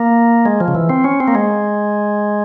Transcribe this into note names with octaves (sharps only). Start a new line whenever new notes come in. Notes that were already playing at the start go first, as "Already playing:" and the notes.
Already playing: A#3
G#3
F3
C#3
E3
C4
C#4
C4
A#3
G#3